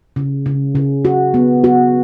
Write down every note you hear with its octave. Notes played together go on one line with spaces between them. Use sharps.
C#3
C#3
C#3
F#4
B3
F#4